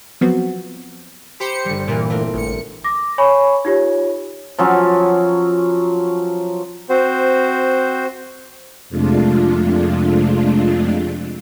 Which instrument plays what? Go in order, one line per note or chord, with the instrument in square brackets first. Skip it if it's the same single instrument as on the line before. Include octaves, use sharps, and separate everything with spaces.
[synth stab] F3 F#3 B3 C4 F#4
[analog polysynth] G4 C5 C#7 [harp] B5
[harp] G1 G3
[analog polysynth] A#2 E3 [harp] G4 A#4
[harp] A3 C4 A#4
[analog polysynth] A1 C#7
[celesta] D6 A#6
C#5 G#5 B5 C#6
D#4 F4 G4 C#5
[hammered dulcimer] F3 F#3 C#4
[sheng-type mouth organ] C4 F#4 C5
[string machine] F2 C3 G#3 A3 D4 F4